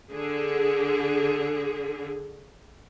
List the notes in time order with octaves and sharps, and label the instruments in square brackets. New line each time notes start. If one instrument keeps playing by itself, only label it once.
[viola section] D3 G#4